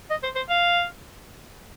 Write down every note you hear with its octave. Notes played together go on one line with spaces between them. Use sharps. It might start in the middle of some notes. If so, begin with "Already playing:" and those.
D#5
C5
C5
F5